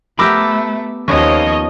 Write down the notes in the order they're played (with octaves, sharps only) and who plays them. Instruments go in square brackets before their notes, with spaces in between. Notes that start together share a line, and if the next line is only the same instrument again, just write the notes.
[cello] A3 [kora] B3 G4 A#4 [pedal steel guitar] B5 D6 E6
[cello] D#2 [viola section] F3 C#5 D#5 [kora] B3 C#4